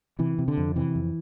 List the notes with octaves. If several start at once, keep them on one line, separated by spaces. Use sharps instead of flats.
C3 E3
C3
D3
F2
C3 E3
F2